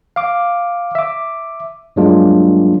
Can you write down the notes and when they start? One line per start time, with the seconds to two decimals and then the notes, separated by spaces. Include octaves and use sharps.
0.16 F5 D6
0.95 E5 D6
1.96 G2 F#3 G#3 A#3 D4 F4